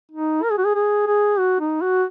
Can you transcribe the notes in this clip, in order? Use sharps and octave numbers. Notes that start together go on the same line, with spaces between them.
D#4
A#4
G#4
F#4
G#4
G#4
G#4
F#4
D#4
F#4